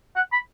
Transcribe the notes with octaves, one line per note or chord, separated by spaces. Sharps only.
F#5
B5